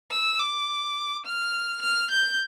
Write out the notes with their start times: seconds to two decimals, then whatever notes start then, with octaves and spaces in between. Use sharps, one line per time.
0.11 E6
0.40 D6
1.25 F6
1.82 F6
2.11 G6